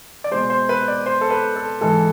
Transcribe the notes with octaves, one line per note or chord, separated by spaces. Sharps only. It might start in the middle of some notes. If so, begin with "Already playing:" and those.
D5
B2 G#3 C5
C5
B4
D5
C5
A4
B4
A4
G#2 E3 G#3 A4